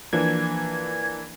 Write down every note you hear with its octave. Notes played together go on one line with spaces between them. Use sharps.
E3 F3 A#3 D4 G#6